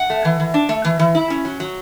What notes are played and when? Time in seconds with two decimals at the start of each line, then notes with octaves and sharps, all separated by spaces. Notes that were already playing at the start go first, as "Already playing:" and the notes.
Already playing: F#5
0.10 A3
0.25 E3
0.40 E3
0.54 D4
0.69 A3
0.85 E3
0.99 E3
1.15 E4
1.30 C#4
1.45 F#3
1.60 F#3